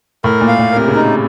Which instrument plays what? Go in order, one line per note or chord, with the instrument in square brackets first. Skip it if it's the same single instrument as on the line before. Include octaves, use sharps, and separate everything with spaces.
[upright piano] A2 [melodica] A#4
[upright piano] A#2
[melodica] F5
[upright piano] A#2
[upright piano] C3 [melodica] A#4
[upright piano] C#3
[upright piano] C3 [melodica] D#4